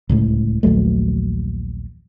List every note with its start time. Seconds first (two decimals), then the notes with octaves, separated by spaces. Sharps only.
0.09 D1 C#2 A2
0.63 A#1 D#2 F#3 A3